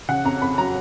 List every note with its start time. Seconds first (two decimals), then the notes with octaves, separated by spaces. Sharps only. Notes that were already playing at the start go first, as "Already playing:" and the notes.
0.09 C#3 F#5
0.25 F2 A#5
0.42 F2 B5
0.58 F#3 A#5